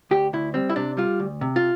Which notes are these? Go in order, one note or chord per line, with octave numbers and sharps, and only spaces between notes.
D2 G4
D2 E4
G3 C4
E4
C3 D4
G3 F4
D2
C3
F4